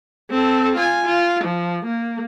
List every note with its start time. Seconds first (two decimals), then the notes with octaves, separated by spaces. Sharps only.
0.31 C4 A4
0.75 F4 G#5
1.04 F4
1.44 F3
1.85 A#3